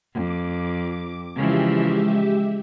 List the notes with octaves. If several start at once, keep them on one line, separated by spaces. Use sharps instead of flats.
F2 D6
C#3 E3 F3 G#3 G4 E5